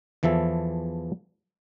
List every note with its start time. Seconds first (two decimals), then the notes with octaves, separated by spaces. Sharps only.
0.23 E2 E3 F3 E4 A4